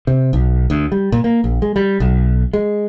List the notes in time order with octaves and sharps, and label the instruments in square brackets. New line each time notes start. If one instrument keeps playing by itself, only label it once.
[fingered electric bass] C3
B1
D2
G3
A#2
A#3
A#1
G#3
G3
B1
G#3